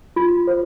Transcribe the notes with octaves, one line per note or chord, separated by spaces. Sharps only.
F4
C5